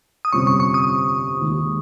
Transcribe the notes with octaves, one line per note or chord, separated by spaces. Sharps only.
D#6
G1 F2 C3 G3 C#4 C#6
C#6
C#6
D#6
D#2 D#3 G#3